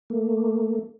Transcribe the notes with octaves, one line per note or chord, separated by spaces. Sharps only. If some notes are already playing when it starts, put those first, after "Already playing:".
A3 A#3